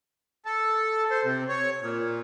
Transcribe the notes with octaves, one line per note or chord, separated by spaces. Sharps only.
A4
C5
C3
C#5
A#2